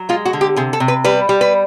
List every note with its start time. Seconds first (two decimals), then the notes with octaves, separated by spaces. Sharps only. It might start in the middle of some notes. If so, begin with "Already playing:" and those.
Already playing: F#3
0.09 G#3 F4
0.25 F#4
0.33 D3
0.41 G4
0.56 C3 G#4
0.73 A4
0.80 C3
0.88 B4
1.04 G3 B4
1.29 G3
1.41 B4